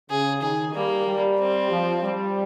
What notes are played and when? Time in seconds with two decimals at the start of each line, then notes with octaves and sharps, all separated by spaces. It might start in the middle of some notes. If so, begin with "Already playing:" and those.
0.10 C#3 G#4
0.42 D#3 G#4
0.74 G3 A#3
1.06 G3
1.39 C4
1.70 F3
2.03 G3